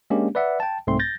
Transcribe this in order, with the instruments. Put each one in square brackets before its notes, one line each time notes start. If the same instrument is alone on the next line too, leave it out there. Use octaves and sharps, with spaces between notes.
[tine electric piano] G#3 A#3 C#4 D4 G4
B4 D5 E5 F#5
G5 A5
C2 G#2 A3 C4 C6
G6 A6 A#6